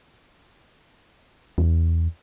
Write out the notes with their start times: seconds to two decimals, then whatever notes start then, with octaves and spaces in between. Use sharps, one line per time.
1.58 E2